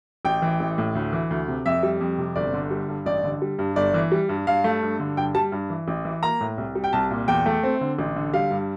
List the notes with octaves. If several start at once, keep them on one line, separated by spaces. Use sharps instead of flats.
A1 G5
E3
A1
A2
D2
E3
D2
C3
F2 E5
G3
F2
C3
G1 D5
D3
G3
G2
A1 D5
D3
G3
G2
G1 D5
E3
G3
G2
G2 F5
A3
G2
D3
G2 G5
G3 A5
G2
E3
A1
E3
A#3 A#5
A2
C2
G3
G5
C2 A5
A#2
E2 G5
A3
C4
D3
A1
D3
G3 F5
G2